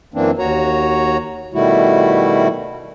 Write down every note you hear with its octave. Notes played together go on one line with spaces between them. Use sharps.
F#2 E3 A#3 C4 D4
D#2 F#4 C#5 A#5
B2 D#3 G3 A3 E4 F#4